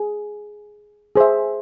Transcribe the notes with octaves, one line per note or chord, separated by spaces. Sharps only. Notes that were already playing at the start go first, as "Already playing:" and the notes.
Already playing: G#4
G#4 C5 E5